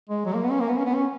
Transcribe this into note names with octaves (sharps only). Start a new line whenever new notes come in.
G#3
F#3
A#3
B3
C#4
A#3
B3
C#4
B3
C#4